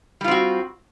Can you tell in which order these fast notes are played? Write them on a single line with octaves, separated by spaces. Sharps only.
G3 F4 C4 F#4